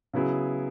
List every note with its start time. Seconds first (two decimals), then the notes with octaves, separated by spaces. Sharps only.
0.13 C#3 F#3 B3 E4 G#4